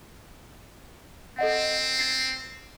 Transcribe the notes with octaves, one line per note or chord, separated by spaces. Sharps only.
C4 A4 D#5 F#5
A6 C7